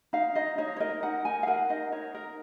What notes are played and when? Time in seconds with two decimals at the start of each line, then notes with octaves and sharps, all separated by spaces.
0.13 D#4 F5
0.35 D#4 D#5
0.58 D#4 C#5
0.77 C#5
0.80 A#4 D#5
1.03 D#4 F#5
1.25 D#4 G#5
1.43 F5
1.47 A#4 F#5
1.70 D#4 D#5
1.92 D#4 C#5
2.15 A#4